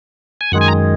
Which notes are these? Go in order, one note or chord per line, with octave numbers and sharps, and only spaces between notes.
G#5
F#2 D#3 G#3 F#5
G#5
A#5